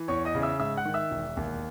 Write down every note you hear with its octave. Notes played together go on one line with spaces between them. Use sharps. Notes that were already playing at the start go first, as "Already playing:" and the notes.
Already playing: E3
E2 C#5 C#6
D#5 D#6
C#3
E5 E6
G#2 E5 E6
F#5 F#6
D#3
E5 E6
E1
D#2